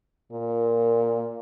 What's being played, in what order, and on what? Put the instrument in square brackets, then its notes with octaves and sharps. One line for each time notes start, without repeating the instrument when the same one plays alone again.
[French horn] A#2 [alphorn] A#4